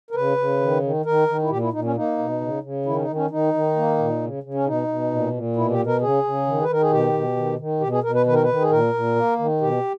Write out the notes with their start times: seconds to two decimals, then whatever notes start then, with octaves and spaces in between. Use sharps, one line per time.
0.11 A#4
0.15 C#3 B4
0.38 C#3
0.60 D#3
0.83 D#3
1.05 D#3 A#4
1.28 D#3
1.43 E4
1.50 A#2 G4
1.62 E4
1.72 A#2 D#4
1.84 C#4
1.96 A#3 D#4
2.18 B2
2.41 C#3
2.63 C#3
2.86 D#3 E4
2.96 C#4
3.01 D#4
3.08 D#3
3.15 C#4
3.31 D#3 D#4
3.54 D#3
3.76 A#3
3.98 A#2
4.21 C#3
4.43 C#3
4.54 C#4
4.65 B2 D#4
4.88 B2
5.11 A#2
5.33 A#2
5.56 B2 E4
5.71 G4
5.78 B2
5.86 A#4
6.01 C#3 G#4
6.24 C#3
6.46 D#3
6.62 B4
6.68 D#3 A#4
6.82 G#4
6.91 B2 G4
7.13 B2
7.36 D#3
7.59 D#3
7.80 B2 G4
7.92 G#4
8.03 B2 A#4
8.15 B4
8.26 D#3 B4
8.34 A#4
8.43 B4
8.49 D#3
8.61 G#4
8.71 A#2 A#4
8.94 A#2
9.16 A#3
9.39 D#3
9.61 B2 G4